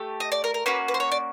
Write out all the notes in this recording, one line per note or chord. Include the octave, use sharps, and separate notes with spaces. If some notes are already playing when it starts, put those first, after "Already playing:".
Already playing: A3 G4
D#5
D5
A#4
A#4
A#3 C#4 F#4 B4
B4
C5
C#5
D5